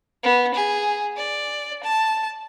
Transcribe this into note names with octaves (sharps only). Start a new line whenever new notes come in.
B3
G#4
D5
A5